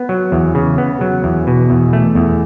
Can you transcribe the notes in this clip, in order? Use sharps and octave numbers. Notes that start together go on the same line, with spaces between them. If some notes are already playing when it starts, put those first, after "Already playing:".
Already playing: B3
F#3
E2
C#3
B3
F#3
E2
B2
E2
A3
E2